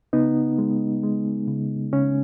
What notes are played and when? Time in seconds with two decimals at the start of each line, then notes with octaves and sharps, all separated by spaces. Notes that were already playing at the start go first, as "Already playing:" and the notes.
0.13 C#3 B3 D#4
0.59 G#3
1.03 G#3
1.47 C#3
1.93 C#3 C#4